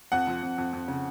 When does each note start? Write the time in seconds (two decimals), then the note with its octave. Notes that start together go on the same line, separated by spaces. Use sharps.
0.12 F2 F#5
0.27 F3
0.43 F2
0.58 F2
0.73 F2
0.88 C#3